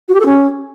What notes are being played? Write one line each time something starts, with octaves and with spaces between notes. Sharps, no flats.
F#4
G4
A4
C#4